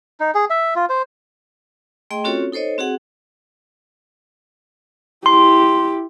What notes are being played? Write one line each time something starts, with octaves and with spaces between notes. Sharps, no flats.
D#4
G#4
E5
F4
C5
A3 G#4 D#5 G5 C6
C4 C#4 F4 F#4 A4 C#5
D#4 A4 C5 C#5 D#5
C4 F#4 G#4 F#5
E4 G4 C6